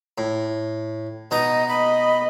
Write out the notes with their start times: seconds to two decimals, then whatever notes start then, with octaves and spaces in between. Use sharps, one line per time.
0.18 A2
1.31 B2 D#4 D#5 A#5
1.68 D#5 B5